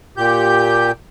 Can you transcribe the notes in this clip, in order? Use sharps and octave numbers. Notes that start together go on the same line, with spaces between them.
A#2 G4 G6